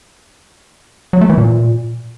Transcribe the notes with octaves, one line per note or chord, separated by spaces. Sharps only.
F#3
A3
E3
A#2